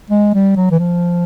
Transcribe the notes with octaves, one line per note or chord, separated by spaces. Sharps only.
G#3
G3
F#3
E3
F3